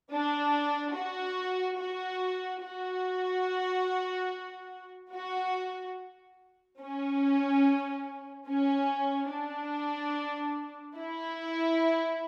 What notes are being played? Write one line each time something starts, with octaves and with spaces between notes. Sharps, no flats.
D4
F#4
F#4
F#4
F#4
C#4
C#4
D4
E4